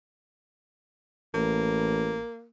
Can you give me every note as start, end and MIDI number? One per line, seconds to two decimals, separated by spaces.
1.34 2.21 33
1.34 2.47 58